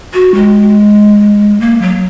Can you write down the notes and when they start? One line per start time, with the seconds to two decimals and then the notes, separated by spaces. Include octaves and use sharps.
0.14 F#4
0.35 G#3
1.61 A#3
1.82 F#3